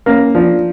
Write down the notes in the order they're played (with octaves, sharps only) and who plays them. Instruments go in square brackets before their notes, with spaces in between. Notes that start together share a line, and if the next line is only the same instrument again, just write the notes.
[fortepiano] A#3 [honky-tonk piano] C#4
[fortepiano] F3 [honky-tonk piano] D4